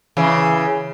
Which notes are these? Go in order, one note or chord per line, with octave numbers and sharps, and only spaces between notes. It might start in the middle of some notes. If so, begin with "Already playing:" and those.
C#3 E3